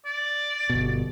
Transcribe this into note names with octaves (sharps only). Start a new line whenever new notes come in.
D5
G1 B2